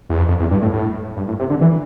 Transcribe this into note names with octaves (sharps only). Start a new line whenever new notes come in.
E2
F2
F2
E2
G2
A2
A2
G2
A2
C3
D3
E3